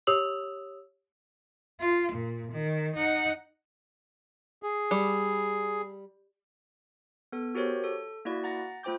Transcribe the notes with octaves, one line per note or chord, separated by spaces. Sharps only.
G4 C#5 D#6 E6 F7 F#7
F4
A#2
D#3
D#4 F#5
G#4
G3
B3 A4
F#4 G4 A#4 C5 C#5
A4
A#3 E4 F#4 D5
F#5 A#5 A6 A#6
A3 F4 C5 G5 D6 G6